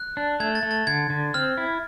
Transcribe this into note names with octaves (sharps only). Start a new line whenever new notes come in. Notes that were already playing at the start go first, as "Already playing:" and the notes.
Already playing: F#6
D4
A3 G#6
A6
A3
A6
D3 G#6
D3
C4 F6
E4